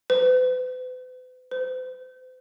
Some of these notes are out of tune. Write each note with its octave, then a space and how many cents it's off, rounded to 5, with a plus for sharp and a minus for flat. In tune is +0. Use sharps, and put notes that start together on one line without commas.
B4 +45
C5 -40